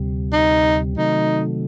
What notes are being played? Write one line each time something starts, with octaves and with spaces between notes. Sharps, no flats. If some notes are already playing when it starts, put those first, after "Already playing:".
Already playing: D2 C3 G3
D#4
C3 D#3 F#3 A3 D#4